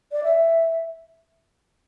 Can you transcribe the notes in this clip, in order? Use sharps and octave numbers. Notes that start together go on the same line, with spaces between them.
D5
E5